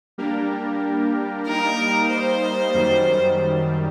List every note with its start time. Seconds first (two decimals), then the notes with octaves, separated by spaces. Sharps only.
0.18 G3 A#3 D4 G4 A#4
1.47 G3 A#3 D#4 A#4
2.11 C5
2.74 F#2 D#3 G3